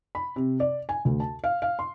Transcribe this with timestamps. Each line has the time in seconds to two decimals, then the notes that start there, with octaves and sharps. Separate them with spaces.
0.15 B5
0.36 C3
0.60 D5
0.89 G#5
1.05 D2
1.20 A5
1.44 F5
1.62 F5
1.79 C6